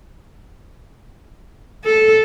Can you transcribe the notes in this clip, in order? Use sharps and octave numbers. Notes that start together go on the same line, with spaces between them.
A4